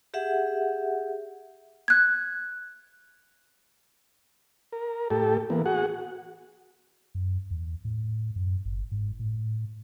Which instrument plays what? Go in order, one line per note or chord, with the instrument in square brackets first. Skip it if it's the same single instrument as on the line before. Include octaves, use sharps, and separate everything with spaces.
[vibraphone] G4 G#4 E5 F#5
[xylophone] F#6 G#6
[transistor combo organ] A#4
A2 G4 A4
E3 A#3 B3
F#4 G#4 F#5
[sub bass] F#2
E2
A2
F#2
G1
G#2
A2